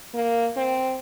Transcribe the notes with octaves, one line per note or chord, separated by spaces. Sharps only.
A#3
C4